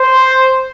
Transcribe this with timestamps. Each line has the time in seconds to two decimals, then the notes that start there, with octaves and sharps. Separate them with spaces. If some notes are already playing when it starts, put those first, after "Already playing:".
Already playing: C5